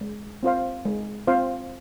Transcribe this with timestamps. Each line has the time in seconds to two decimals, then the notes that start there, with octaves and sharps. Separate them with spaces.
0.01 G#3
0.43 C4 F4 C5 F5
0.85 G#3
1.27 C4 F4 C5 F5